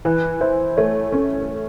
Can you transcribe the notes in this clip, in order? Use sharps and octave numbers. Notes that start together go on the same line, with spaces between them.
E3 B4
E4 C5
A3 C#5
C#4